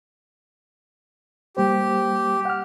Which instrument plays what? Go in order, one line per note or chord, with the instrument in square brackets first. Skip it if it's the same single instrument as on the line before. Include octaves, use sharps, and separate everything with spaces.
[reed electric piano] G3 A#3 C5 [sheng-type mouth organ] G4
[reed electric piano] F#5 F6